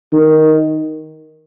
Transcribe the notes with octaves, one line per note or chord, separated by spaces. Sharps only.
D#3